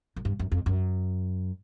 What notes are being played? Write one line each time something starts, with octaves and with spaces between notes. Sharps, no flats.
F#2
G2
F#2
F2
F#2